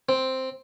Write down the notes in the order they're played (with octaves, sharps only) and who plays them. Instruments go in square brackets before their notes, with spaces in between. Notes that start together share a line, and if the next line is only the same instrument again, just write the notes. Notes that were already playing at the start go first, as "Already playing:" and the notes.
[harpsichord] C4